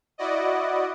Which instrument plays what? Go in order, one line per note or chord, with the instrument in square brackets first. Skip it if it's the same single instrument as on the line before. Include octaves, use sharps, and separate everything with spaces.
[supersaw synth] E4 F#4 D5 D#5